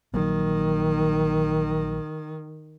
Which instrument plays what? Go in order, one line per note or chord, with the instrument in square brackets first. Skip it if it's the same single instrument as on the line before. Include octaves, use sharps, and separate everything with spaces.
[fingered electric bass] A#1 F#3 A#3 [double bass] D#3